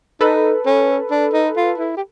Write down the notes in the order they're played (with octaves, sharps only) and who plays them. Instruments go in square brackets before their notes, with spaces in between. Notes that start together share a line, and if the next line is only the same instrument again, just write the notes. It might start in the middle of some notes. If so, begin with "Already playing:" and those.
[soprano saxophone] D#4 [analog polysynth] A4 B4
[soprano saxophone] C#4
D4
D#4
F4
E4
G4